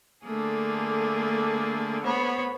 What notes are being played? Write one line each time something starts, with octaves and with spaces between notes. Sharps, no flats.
D3 A3 A#3 G#4
B3 C5 C#5 B5